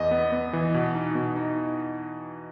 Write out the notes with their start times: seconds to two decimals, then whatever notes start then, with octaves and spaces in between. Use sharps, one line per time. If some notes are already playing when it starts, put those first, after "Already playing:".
Already playing: E2 D#5
0.11 B3
0.32 B3
0.53 E3
0.74 B2
0.94 D#4
1.15 B2
1.36 D#4